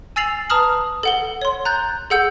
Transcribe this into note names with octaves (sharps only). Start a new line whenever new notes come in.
G#5 E6 A6 C7 F7 F#7
B4 A5 A#5 D#6 F6 F#7
A4 F#5 G7
C#5 C6
A#5 F#6 G6 A6
G#4 A4 F#5 E6 G6